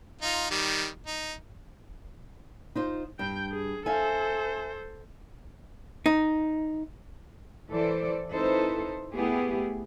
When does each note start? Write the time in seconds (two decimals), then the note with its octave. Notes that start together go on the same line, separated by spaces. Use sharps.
0.21 D#4 F4
0.51 D#3 G3
1.06 D#4
2.75 D#4 F4 C5
3.19 G2 G5 G6
3.52 G#4
3.86 A4 C5 E5 F5 G#5
6.06 D#4
7.70 E3 A4 C5 D5
8.30 C4 D#4 E4 A4 B4 C5
9.13 A3 B3 E4 G4 G#4